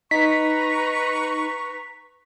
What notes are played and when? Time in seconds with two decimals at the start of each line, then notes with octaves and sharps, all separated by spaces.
0.11 D#4 B4 A#5 C#6 B6